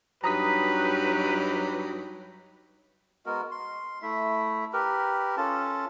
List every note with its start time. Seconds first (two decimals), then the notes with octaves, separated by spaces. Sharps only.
0.24 G2 F#3 D#4 G4 B4 A#5 D#6 B6
3.26 G#3 B3 F#4 A#4
3.51 C6
4.02 A3 E4 E5
4.73 G4 A#4 B4
5.37 C#4 F4 A4 A5